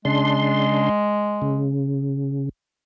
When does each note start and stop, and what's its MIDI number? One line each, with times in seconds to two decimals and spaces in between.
0.05 0.89 49
0.05 1.74 56
0.05 0.89 62
0.05 0.89 84
1.42 2.49 49